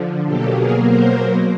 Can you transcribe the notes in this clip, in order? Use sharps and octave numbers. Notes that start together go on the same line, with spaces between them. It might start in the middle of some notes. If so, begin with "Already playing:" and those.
Already playing: D3 F3
B2 F#3 A#3 G4 A4
G#4 A#4
A#4 C5